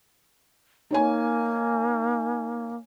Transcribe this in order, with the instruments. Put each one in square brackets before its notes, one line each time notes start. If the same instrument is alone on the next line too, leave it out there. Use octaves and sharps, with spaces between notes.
[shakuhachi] A#3 [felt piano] D#4 C#5 G#5